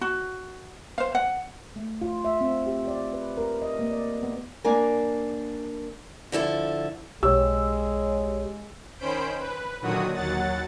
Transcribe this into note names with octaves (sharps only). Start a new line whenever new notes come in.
F#4
C5 F5
F#5
A3
F4
E5
C4
G4
D5
B4
A#4
D#5
A#3
D5
B3
A#3 D4 A#4 G#5
D3 F3 E4 A4
B1 G#3 G4 C#5 E6
D#3 C#4 C5 B5 G6 D7
B4
A#2 D3 D#3 F#3 F#4 D#6
D#2 F#3 F#5 A6